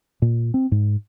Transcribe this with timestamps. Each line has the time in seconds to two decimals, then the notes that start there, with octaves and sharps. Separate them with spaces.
0.22 A#2
0.54 C4
0.72 G#2